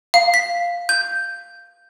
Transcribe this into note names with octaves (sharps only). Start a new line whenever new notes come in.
F5
B6
G6